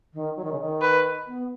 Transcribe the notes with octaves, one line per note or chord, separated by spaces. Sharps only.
D#3
F#3
D#3
C#3
D#3
B4
B3